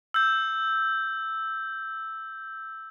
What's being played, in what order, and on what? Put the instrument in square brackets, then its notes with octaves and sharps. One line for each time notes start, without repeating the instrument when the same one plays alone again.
[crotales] E6 G6